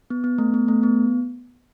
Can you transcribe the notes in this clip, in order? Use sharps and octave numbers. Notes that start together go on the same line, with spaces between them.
B3
B3
A3
B3
A3
B3